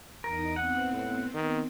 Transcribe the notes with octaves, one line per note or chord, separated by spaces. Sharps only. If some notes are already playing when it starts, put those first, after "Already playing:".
E2 D#4 A#4 D#6
B3 C4 F#5
A2
D#3